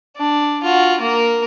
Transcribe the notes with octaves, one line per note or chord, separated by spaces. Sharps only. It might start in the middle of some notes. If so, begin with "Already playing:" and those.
D4
F4 F#4
A#3 A#4